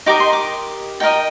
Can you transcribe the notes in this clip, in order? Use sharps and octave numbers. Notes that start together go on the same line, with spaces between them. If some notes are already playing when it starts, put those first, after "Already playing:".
D#4 G4 A#4 D#5 D6
C6
D6
D#4 G4 A#4 D#5 G5